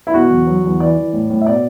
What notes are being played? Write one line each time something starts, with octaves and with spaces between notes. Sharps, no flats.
E4
B2 F#4
E2
F#3
E2
E3 D5
E3
A2
A2
E5
B2 D5